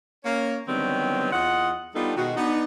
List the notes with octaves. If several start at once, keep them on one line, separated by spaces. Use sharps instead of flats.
A#3 C#4 C#5
D3 D#3 F#3 G3 B3 C4
E2 F4 D#5 F#5
G3 B3 D4 D#4 F4 A4
B2 D#3 G#3 F#4
B3 D4 D#4